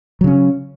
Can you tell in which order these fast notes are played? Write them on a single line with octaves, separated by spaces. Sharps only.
F#3 C#3 C#4